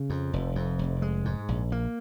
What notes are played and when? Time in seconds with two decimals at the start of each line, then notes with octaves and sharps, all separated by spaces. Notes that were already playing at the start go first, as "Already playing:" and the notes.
Already playing: C#3
0.10 F2
0.33 F1
0.56 F2
0.79 F1
1.02 G#3
1.25 G#2
1.49 A#1
1.72 A#3